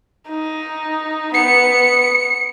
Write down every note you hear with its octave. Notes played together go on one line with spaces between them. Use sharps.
D#4
B3 C#7